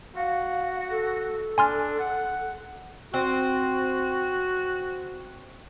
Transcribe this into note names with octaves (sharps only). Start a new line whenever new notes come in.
F#4 F5
A4
D4 G#5 C6 F6
F#5
C4 F#4